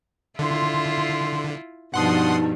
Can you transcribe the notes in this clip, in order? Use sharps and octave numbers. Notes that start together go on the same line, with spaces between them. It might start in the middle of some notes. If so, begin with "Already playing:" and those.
D3 E4 F4 C6
G2 B2 F3 D#4 F#5 A5 C6 D#6